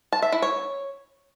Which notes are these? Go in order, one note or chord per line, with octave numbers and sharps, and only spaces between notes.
A5
E5
E4
C#5